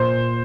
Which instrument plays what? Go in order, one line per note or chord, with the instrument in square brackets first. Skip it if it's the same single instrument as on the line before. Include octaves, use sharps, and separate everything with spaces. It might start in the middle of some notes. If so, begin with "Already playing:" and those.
Already playing: [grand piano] A#2 C5